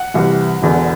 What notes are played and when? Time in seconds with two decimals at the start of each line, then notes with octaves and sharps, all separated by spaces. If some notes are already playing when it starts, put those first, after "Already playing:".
Already playing: F#5
0.14 C2 C3 E3
0.62 E1 E2 D3